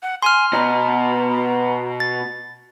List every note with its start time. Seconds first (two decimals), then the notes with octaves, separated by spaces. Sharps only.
0.03 F#5
0.22 G#5 C6 F6
0.53 B2 D#5 A#5
2.00 A6